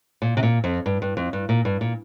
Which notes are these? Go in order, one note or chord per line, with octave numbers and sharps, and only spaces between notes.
A#2
C3
A#2
F2
G2
G2
F2
G2
A#2
G2
A#2